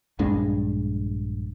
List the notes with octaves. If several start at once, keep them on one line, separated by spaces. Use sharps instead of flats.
A#1 G2 G#3 D4